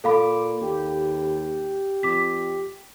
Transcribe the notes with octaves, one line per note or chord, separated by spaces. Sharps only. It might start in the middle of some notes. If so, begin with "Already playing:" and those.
A#2 A4 F5 B5 D6
D#2 G4
F2 D6 B6